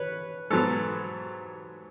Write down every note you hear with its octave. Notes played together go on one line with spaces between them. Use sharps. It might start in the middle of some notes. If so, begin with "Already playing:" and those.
Already playing: B4 C#5
G#2 F#3 B3 A4